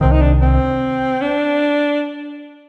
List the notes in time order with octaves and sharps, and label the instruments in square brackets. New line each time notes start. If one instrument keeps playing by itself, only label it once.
[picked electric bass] C2 C3 D#3 [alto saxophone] C4
[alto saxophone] D#4
D4
C4
D4